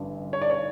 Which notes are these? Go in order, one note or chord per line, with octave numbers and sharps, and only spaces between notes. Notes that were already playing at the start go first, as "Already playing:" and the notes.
Already playing: A1 G2 D3
C#5
D5
C#5